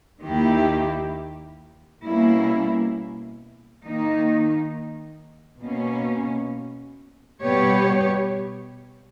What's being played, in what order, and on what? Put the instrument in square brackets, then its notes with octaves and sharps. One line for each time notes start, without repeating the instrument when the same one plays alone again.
[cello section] D#2 D#3 A#3 E4 G4
B2 G3 A#3 C#4 E4
D#3 A#3 D#4
B2 A#3 C#4
B2 G3 B3 G4 C#5